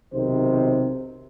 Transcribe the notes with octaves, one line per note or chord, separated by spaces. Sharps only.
B1 C3 D#3 C5